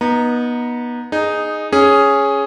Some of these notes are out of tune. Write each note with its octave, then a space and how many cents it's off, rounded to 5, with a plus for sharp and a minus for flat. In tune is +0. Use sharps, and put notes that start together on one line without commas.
B3 -25 D#4 +0 A#5 +0
D#4 -10 G#4 +0
C#4 +0 G#4 +0